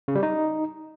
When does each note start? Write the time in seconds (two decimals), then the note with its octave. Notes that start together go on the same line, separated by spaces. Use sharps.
0.08 C#3
0.15 G3
0.23 D#4